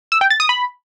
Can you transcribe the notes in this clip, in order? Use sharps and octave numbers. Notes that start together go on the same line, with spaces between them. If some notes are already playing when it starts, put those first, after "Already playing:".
E6
G5
A6
D#6
B5